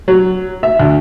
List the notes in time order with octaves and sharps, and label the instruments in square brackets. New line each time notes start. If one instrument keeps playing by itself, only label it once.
[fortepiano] F#3
E5
D2